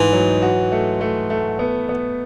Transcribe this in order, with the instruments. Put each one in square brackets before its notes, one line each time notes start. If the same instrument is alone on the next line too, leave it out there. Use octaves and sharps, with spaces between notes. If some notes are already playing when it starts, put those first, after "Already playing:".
Already playing: [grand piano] G#2 A3 D#4 [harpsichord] E3
[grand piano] F#3
F#4
A3
A3
A3
B3
B3